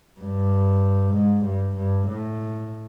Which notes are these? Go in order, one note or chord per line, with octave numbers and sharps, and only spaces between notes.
G2
G#2
G2
G2
A2